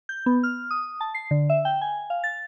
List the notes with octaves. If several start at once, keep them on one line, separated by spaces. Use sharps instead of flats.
G6
B3
F6
D#6
A5
C7
D3
E5
G5
G#5
F5
A6